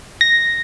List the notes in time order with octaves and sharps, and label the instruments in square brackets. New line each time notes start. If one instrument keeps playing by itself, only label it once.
[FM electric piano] A#6